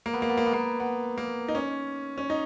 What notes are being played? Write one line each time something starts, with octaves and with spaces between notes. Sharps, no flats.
A#3
B3
A#3
B3
A#3
B3
A#3
B3
A#3
D#4
C#4
C#4
D#4